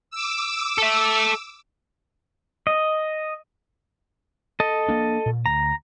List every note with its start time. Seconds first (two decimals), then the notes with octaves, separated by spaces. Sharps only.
0.11 D6 E6
0.78 A4 E5
2.67 D#5
4.60 A4 D#5
4.89 A#3 D4
5.26 A#2
5.46 D2 A#5